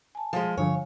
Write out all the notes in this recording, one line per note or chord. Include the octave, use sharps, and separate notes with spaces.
G#5 A5
F3 G#3
G2 D3 F3 C#5 F5 G#5